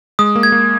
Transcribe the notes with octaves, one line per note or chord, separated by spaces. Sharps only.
G#3 D#6
A#3
G#6
A#3